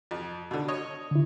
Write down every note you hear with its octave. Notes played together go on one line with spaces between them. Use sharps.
F2
B2 D3
C#5 D#5
D3 E4